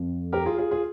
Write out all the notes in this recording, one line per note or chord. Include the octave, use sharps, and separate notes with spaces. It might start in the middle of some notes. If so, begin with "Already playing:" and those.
Already playing: F2
G4 A#4
F4 G#4
F4 G#4
F4 G#4